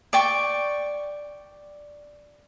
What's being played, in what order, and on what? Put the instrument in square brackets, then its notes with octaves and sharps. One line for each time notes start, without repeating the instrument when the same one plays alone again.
[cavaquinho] D5 G5 C#6